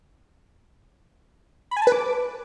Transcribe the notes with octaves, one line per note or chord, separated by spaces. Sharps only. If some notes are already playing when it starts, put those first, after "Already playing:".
B5
G#5
A5
B4
D6